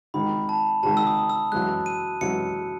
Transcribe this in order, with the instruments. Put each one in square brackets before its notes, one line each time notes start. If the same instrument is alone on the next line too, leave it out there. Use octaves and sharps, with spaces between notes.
[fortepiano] G#1 G#2 D#3 [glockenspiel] B5
[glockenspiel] A5
[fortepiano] G#1 G#2 D#3 [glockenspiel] A5
[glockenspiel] E6
D#6
E6
[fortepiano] F#2 E3 G#3 [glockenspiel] F#6
[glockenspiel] D#7
[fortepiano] F#2 E3 G#3 [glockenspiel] C#7